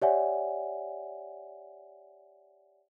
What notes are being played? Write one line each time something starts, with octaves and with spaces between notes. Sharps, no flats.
G4 C#5 D5 E5 F#5 G#5